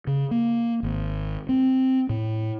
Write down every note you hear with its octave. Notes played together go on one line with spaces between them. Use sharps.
C#3
A#3
G#1
C4
A2